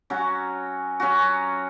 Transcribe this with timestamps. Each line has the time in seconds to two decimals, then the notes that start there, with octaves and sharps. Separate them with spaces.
0.10 F#3 C#4 F#4
1.00 F#3 C#4 F#4